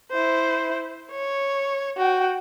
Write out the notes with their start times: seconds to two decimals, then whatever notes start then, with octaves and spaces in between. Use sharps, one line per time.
0.11 E4 C5
1.11 C#5
1.97 F#4 G5